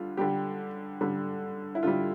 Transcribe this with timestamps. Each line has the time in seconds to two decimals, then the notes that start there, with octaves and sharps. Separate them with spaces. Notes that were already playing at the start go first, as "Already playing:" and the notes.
Already playing: D3 G3 F4
0.17 D3 G3 G4
1.01 D3 G3
1.75 E4
1.83 D3 G3 F4